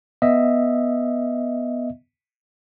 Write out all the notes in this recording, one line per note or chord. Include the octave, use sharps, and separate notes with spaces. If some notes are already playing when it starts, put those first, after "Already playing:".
B3 D#5 E5